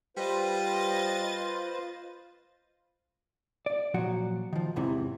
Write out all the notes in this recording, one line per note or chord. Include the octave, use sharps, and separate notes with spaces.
G3 F4 B4 C5 D#5 A6
D5
A#2 F3 F#3 F#4 F#5
D#3 F3
E2 G#2 C3 E3 E4